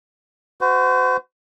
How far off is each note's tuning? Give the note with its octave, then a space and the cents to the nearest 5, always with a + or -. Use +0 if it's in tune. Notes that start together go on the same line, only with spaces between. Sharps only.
F#4 +0 C5 -40